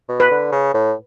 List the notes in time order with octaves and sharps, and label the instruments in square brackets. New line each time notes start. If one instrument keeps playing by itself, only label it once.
[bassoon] B2
[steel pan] B4
[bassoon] D3
C#3
A2